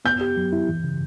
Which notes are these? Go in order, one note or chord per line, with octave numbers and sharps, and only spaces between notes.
B3 G6
G4
F#3
E4
E3
C#3